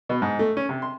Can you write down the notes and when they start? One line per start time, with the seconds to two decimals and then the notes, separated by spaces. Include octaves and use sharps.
0.09 B2
0.22 G#2
0.39 A3
0.57 C#4
0.69 C3
0.82 C6